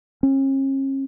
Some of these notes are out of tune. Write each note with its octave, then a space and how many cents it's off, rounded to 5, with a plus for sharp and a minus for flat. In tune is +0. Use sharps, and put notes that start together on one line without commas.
C#4 -40